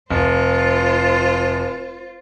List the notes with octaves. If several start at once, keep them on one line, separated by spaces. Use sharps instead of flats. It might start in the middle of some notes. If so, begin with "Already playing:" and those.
F1 F4 C5